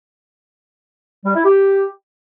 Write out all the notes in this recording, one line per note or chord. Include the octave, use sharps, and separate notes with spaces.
G3
E4
G4